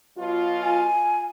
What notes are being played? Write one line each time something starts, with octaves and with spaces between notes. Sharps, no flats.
B2 F#3 F4
G#5